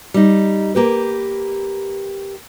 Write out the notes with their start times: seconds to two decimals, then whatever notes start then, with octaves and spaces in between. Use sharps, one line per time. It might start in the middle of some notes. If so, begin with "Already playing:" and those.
0.14 G3 D#4
0.75 A#3 G4 B4